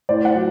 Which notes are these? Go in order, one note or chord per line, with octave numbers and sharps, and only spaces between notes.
A2 C5 D5
F#5
F#3